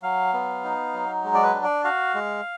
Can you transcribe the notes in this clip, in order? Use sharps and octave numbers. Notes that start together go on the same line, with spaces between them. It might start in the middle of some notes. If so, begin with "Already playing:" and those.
F#3 F5
B3
D#4
F#3
G#3
D5
B4
D4
D5
F#4 F5
G#3